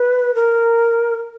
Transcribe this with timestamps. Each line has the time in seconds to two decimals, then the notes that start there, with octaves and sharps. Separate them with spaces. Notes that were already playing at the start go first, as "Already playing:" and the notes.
Already playing: B4
0.35 A#4